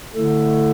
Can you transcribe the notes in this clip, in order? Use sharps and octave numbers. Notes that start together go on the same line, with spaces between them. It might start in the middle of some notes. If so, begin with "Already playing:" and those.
D3 A3 E4 A4